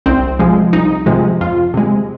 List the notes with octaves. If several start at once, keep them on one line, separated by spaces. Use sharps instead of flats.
C2 C4
C3 F3 G#3
C2 D#4
C3 F3 G#3
F2 F4
C3 G#3